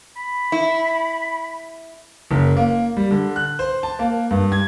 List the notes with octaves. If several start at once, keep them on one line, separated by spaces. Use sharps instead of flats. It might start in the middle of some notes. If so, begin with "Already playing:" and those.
B5
E4
F#1
A#3
G3
D3
F#6
C5
A5
A#3
G2
G#6